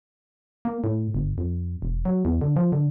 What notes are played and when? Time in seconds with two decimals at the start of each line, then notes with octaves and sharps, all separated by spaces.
0.65 A#3
0.84 A2
1.15 G1
1.38 F2
1.82 E1
2.05 F#3
2.25 E2
2.41 D3
2.56 F3
2.72 D3